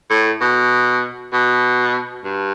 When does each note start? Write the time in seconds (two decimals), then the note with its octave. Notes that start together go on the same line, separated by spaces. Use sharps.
0.10 A2
0.41 B2
1.33 B2
2.24 G2